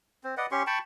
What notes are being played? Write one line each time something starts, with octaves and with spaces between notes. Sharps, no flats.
C4
B4 D5 D#5 F#5
C#4 G4 C6 C#6
G5 A5 B5 C#6